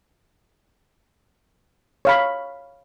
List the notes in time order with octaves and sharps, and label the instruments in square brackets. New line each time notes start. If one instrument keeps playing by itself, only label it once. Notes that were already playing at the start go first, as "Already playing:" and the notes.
[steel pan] C#5 F5 B5